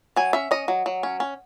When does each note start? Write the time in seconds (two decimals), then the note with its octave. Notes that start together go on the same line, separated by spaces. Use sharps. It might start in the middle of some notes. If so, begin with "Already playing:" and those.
0.16 F#3 G#5
0.33 C#4 E5
0.51 C#4 D#5
0.68 F#3
0.86 F#3
1.03 C#4
1.20 C#4